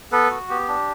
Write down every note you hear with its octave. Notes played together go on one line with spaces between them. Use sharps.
B3 A4 B4
F#4
B3 G4
D4